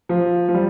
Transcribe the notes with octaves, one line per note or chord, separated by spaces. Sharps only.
F3
F3
G3